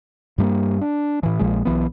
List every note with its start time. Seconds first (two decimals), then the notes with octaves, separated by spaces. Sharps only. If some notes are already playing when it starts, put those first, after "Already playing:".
0.38 G2 G3 G#3 A#3
0.81 D4
1.23 A2 E3
1.39 A#1 A#2 F3 G#3
1.65 B1 E3 B3